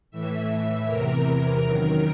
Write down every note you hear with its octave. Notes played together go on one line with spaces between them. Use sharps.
A2 E3 E5
E2 C3 E3 A#4
F#2 D#3